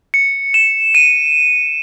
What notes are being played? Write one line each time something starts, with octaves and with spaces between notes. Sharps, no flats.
C#7
E7
D#7